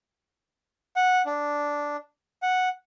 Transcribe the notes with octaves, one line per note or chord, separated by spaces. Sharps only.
F#5
D4
F#5